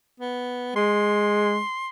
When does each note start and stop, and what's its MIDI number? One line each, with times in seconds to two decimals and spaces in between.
0.20 0.76 59
0.76 1.61 56
0.76 1.89 84